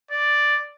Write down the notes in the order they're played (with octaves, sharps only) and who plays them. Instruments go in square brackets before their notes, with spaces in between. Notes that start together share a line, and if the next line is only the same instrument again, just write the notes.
[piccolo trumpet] D5